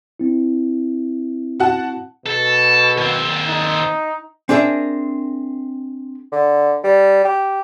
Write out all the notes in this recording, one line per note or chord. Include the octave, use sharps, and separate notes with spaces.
C4 E4
F#4 F#5 A5
B2 A4
D#2 C4
D#4
C4 D4 G#4 A#4 E5
D3
G3
G4